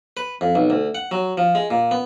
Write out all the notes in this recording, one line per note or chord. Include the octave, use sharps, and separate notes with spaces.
B4
F2
B1
D2
F#5
F#3
F3
G#3
A#2
B3